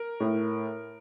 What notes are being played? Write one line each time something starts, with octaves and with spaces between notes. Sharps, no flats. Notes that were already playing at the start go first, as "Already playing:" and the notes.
Already playing: A#4
A2